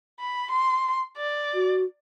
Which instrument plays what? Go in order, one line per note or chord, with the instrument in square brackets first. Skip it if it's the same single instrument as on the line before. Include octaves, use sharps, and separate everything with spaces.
[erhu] B5
C6
D5
[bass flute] F#4